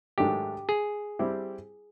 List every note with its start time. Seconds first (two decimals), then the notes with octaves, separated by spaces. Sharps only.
0.18 G#2 D#3 F#3 A3 D4 G4
0.69 G#4
1.19 G3 C4 E4 G4